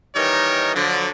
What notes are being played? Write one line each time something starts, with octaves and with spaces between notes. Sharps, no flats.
D#3 E3 G3 D#4 A#4 C#5
D3 F3 F#3